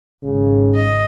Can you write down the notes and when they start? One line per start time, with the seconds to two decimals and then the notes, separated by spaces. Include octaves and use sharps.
0.23 G#1 C#3
0.75 D#5